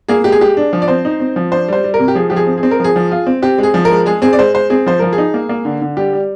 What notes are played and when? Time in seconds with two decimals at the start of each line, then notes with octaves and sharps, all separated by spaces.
0.08 A#3 G#4
0.24 G#3 G4
0.32 G#4
0.41 G#3 G4
0.57 D4
0.73 F3
0.82 D5
0.88 C4 C5
1.05 D#4
1.20 C4
1.36 F3
1.51 D4 C5
1.68 G3 C5
1.84 G3
1.94 A#4
1.99 C3
2.08 G4
2.15 F3 G#4
2.30 F3 G4
2.36 G#4
2.47 C4
2.58 G#4
2.63 C4
2.71 A#4
2.80 F3 G#4
2.96 F3
3.11 F4
3.27 C4
3.42 C4 G4
3.58 G#3
3.63 G#4
3.74 F3
3.85 A#4
3.91 G#3
4.06 G#3 G#4
4.22 C4 G#4
4.33 D5
4.39 G#3 C5
4.55 G#3 C5
4.70 C4 G#4
4.86 F3 C5
4.99 F3 A#4
5.13 G#4
5.18 D#4
5.34 A#3
5.49 A#3
5.65 D3
5.82 D3
5.97 G3 G4
6.13 G3